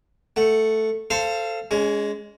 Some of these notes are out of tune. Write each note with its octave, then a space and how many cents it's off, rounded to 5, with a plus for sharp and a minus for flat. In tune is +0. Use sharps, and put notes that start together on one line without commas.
A3 +0 F#5 +0
A4 +10 C5 +0 F5 -25
G#3 +0 C#4 +35